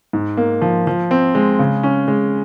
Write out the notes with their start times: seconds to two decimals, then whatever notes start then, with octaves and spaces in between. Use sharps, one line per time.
0.13 G#2
0.37 A#3
0.62 F3
0.87 F3
1.11 C4
1.35 G#3
1.59 C#3
1.83 C#4
2.08 G#3